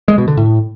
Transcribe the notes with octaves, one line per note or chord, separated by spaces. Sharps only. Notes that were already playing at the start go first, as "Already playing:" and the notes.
G#3
B2
D3
A2